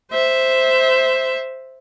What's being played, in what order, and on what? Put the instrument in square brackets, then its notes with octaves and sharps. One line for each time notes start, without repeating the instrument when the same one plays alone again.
[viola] C5 E5